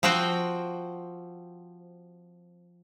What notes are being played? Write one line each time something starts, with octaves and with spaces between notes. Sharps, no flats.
F3 C4 F#4 C5 G5